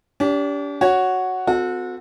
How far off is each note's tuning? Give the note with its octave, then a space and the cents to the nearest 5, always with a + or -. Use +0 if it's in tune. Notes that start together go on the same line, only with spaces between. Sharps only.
D4 -40 G4 +0
F#4 +0 C#5 +0
C4 -40 F#4 -30 A4 +0